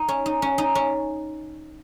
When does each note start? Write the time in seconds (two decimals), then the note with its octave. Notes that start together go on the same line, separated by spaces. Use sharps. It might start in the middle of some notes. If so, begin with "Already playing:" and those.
Already playing: D#4
0.09 C#4
0.26 D#4
0.42 C#4
0.58 D#4
0.75 C#4